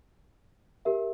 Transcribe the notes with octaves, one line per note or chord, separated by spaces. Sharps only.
G4 A#4 E5